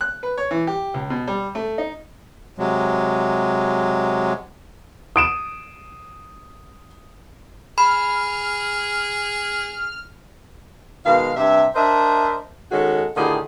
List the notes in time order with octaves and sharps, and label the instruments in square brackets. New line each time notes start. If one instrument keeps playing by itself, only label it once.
[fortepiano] F#6
B4
C#5
E3
G4
C#2
B2
G3
A3
D#4
[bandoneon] C3 F#3 G#3
[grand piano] D#6 D7 E7
[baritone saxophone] G#4 [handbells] B5 [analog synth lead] F6
[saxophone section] B2 D#3 G#3 F5
G2 C3 G4 E5
D4 A#4 C5 D#5 E5
D#3 G#3 C#4 F#4 G#4 A4
A2 D3 D#3 F4 G4 G#4